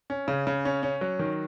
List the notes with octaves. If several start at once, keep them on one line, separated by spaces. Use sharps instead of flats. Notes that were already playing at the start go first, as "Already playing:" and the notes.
C#4
C#3
C#3
C#4
C#4
F#3
D#3